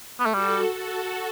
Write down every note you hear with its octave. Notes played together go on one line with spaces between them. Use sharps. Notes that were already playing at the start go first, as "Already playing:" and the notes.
B3
A3
G3 F#4 A4
F#4 A4